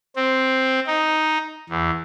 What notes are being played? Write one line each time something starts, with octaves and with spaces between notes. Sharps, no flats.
C4
D#4
E2